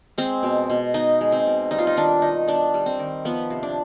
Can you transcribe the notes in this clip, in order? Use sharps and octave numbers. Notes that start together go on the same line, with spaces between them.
G#3 C4
B2
B2
B3 D#4
G#3
C4
B2
G3 D#4
F4
D#4
D#3 D4
D#3 D#4
B3 D4
G3
C4
D#3
F3 B3
C3
D4